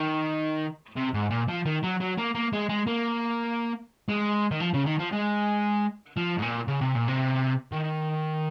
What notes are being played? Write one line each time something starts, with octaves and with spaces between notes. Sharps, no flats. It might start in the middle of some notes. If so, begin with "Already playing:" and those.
Already playing: D#3
C3
G#2
A#2
F3
D#3
F#3
F#3
A#3
A#3
G#3
G#3
A#3
G#3
D#3
F3
C#3
D#3
F3
G#3
F3
G#2
A#2
C#3
C3
A#2
C3
D#3